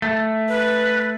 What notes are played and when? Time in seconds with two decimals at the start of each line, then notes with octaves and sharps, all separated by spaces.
0.02 A3
0.48 B4